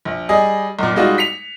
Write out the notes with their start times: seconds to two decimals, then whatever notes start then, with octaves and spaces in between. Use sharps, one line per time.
0.05 A#1
0.29 G3 G#4 D#5
0.79 B1 A#2
0.96 G3 G#3 D#4 F4 F#4
1.18 B6 C#7 F7